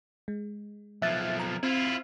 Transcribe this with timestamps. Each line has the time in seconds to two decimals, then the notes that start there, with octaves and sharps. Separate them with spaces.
0.28 G#3
1.02 B1 F3 E5 F#6 A6
1.39 A#5
1.63 C4 E4 F4